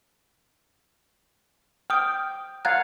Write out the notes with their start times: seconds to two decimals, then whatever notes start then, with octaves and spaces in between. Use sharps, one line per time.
1.90 G5 D#6 F6
2.65 F5 F#5 A#5 F#6 G#6 A6